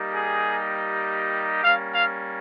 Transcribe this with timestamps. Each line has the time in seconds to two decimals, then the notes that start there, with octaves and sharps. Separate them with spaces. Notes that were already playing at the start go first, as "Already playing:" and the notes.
Already playing: G3 A#3 D#4 G4
0.12 G#4
1.63 G3 A#3 C#4 F5
1.94 F5